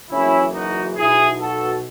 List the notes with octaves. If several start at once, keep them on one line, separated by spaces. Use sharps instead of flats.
F#1 F#2 C#3 E3 C#4 E4
D#4 F#4
B1 B2 E4 G#4
F#4 A4